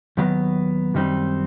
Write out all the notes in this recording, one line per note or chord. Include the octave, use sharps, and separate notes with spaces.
D#2 D#3 F#3 B3
F#2 D#3 G3 C4 D#4